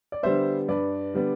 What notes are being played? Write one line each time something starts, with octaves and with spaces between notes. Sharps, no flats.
D5
D3 G3 B3 C5 E5
G2 B4 D5
D3 G3 B3